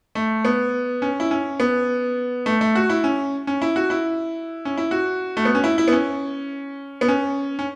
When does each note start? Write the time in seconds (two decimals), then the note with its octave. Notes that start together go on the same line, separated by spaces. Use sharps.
0.15 A3
0.45 B3
1.02 C#4
1.20 E4
1.31 C#4
1.60 B3
2.46 A3
2.61 A3
2.75 F#4
2.90 E4
3.04 C#4
3.47 C#4
3.62 E4
3.76 F#4
3.90 E4
4.65 C#4
4.77 E4
4.91 F#4
5.37 A3
5.45 B3
5.55 C#4
5.64 E4
5.78 E4
5.88 B3
5.92 C#4
7.01 B3
7.08 C#4
7.59 C#4